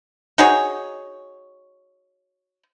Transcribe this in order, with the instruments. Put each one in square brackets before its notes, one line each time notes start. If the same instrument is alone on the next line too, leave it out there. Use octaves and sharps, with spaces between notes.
[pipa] D#4 F#4 G#4 C#5